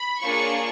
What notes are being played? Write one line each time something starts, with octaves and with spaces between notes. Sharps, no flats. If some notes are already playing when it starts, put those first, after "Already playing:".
Already playing: B5
A#3 D4 F4 G#4 C#5 C#6